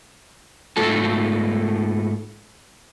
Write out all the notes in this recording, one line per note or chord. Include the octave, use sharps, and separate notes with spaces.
G#2 A3 F4 A4 A5